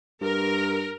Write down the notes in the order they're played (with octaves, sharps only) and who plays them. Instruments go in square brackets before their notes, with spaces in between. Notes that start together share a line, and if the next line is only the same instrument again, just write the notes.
[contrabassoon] G2 [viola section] A#4